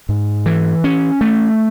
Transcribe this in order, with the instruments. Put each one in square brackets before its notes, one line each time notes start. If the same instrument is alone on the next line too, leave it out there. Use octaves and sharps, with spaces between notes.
[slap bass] G#2
E3
C#4
A3